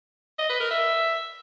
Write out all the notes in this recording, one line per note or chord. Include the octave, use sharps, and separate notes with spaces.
D#5
B4
A#4
E5